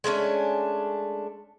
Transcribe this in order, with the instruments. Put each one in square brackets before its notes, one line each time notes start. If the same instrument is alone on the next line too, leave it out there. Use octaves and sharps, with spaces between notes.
[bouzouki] G#3 A3 C#4 D4